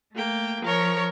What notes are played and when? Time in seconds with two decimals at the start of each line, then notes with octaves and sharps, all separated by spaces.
0.14 A3 A#3 G5
0.62 F3 A#4 C#5 C#6